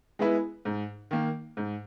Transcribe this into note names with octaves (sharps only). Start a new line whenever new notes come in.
G#3 B3 E4 B4
G#2
D#3 A#3
G#2